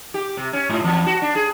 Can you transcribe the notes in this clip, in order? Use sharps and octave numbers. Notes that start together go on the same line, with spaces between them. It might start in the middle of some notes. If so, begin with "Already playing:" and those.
G4
C3
C#4
G#2
E2
F#4
D4
G#4